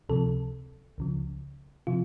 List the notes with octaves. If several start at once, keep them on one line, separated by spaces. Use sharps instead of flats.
C#2 C3 F3 A4
C#2 C#3 F3
C3 F3 F4